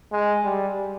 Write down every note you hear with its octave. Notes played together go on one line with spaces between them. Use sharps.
G#3
G3